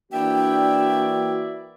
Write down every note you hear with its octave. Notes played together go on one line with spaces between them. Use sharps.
E3 A#3 D4 E4 F#4 D5 E5 G5